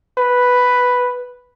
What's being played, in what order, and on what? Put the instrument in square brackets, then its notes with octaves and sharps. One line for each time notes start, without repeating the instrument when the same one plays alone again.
[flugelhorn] B4